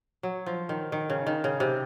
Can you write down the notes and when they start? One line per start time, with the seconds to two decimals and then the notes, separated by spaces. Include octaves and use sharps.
0.23 F#3
0.46 F3
0.69 D#3
0.92 D#3
1.10 C#3
1.27 D#3
1.44 C#3
1.60 C3